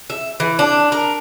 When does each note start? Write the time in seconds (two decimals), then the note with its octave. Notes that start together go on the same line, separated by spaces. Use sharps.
0.10 E5
0.40 E3
0.59 D4
0.92 A#4